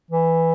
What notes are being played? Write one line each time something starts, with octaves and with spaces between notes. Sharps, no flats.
E3